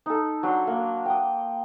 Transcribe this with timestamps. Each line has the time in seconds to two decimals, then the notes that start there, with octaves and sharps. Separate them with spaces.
0.06 D#4 A4
0.43 F#3 D4 D5 C6
0.67 A#3
1.05 G5 D#6